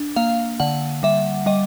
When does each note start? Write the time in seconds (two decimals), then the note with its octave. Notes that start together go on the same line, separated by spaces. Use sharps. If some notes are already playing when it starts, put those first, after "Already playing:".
Already playing: D4
0.16 A#3 F5
0.60 D3 F#5
1.03 G3 E5
1.46 G3 D#5